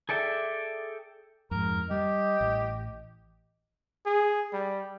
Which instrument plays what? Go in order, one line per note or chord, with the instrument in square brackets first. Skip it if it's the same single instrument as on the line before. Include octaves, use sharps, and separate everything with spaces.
[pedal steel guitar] G#4 A4 D5 E5 G5
[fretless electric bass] F2 G#2 [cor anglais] A#4
[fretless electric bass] G3 [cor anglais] G4 [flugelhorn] D#5
[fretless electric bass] A1
[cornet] G#4
G3